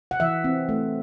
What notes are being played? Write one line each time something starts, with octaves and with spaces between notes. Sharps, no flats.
F#5
E3 E5
C4
A3